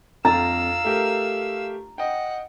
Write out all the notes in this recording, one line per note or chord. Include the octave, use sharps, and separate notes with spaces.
F2 F5 A#5 E6 A6
A3 G4 A#4
D#5 F#5 G5